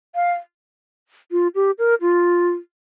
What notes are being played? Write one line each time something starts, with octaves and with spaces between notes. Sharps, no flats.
F5
F4
G4
A#4
F4